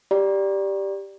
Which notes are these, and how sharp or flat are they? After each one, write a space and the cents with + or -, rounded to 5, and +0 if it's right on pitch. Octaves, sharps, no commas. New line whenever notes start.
G4 +0 D5 +0 A#5 +30